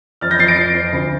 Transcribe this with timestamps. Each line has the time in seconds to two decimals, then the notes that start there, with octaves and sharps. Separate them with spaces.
0.21 F2 F6 A6
0.31 G6 A#6
0.39 F2 A6 C7
0.48 A#6 D7
0.57 F2 A6 C7
0.75 F2
0.93 D2